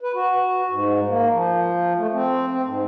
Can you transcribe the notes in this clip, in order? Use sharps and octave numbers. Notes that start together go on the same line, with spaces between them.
B4
F#4
G#2
A#3
F3
A3
C4
C4
G#2